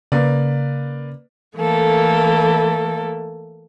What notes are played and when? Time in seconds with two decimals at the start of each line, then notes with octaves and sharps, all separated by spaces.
0.12 C#3 A#3 B4 D5
1.56 E3 A3 A#3 A4